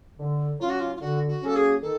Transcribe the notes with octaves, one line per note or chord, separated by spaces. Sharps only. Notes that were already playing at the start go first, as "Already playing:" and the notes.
D3
F#3 A#3 C#4 F4
F#4
F4
F4
D3 F#4
F#4
F#3 A#3 C#4 A4
G#4
D#3 A4